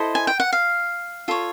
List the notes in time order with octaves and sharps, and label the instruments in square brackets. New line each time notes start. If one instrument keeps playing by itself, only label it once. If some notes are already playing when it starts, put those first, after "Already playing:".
Already playing: [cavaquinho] E4 A4 C5 D#5
G#5
G5
F#5
F5
F4 A4 C#5